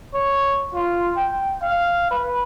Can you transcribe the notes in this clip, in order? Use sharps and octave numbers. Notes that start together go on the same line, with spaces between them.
C#5
F4
G5
F5
B4